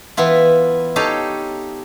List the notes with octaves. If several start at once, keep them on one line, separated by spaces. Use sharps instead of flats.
E3 B3 E4 F4
D#4 G4 A4 C#5 F5 A5